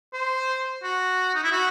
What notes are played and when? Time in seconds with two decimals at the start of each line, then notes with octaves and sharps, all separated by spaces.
0.13 C5
0.83 F#4
1.35 D#4
1.44 E4
1.52 F#4